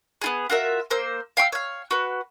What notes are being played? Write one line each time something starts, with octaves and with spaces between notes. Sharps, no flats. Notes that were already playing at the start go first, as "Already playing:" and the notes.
B3 F4 G#4
F4 F#4 A#4 E5
A#3 C5 E6
F5 G5 C#6 E6
C#5 F5
F#4 B4